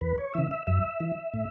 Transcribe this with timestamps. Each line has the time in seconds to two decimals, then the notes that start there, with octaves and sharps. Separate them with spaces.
0.01 E2 B4
0.18 C#5
0.34 C#3 E3 E5
0.51 E5
0.67 F#2 E5
1.00 E3
1.34 A2